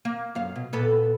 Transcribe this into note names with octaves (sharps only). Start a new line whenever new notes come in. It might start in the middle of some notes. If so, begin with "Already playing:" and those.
A#3
F#2 F5
B2
A#2 B3 A4